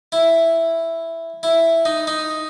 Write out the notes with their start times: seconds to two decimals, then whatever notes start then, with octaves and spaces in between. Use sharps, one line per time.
0.12 E4
1.43 E4
1.85 D#4
2.07 D#4